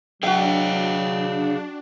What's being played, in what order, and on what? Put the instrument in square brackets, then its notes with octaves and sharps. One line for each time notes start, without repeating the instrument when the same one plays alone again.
[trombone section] F#3 [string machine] D4 [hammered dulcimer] F#4 G5 [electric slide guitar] G#4 D#5 F5